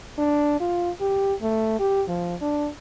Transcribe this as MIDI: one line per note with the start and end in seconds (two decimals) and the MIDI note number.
0.18 0.60 62
0.60 0.90 65
1.01 1.34 67
1.42 1.78 57
1.79 2.03 67
2.08 2.35 53
2.41 2.68 62